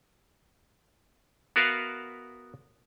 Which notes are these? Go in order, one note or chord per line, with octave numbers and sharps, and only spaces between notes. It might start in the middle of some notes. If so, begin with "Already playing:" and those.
B3 F#4 A#4 B4 E5 F5